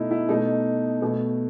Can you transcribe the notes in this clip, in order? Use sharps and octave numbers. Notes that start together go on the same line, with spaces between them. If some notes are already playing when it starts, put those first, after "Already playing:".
Already playing: B2 A3 D#4 E4
E4
B2 A3 D#4
B2 A3